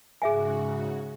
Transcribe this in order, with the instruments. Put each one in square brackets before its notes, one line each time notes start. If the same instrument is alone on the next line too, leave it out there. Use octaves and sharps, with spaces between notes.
[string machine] G#2 C#3 F#4 [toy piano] G#4 E5 G#5